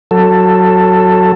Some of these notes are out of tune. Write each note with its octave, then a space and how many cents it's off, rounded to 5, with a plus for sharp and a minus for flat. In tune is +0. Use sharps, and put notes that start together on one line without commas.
F#3 +0 A4 +15